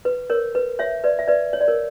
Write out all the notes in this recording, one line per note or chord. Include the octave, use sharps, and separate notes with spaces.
B4
A#4 C#5
B4
C#5 E5
B4 D5
E5
B4 D5
C#5
D5
A#4 C#5